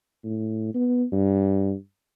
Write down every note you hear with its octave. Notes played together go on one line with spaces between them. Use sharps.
A2
B3
G2